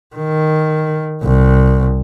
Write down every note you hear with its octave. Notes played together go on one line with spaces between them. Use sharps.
D#3
C2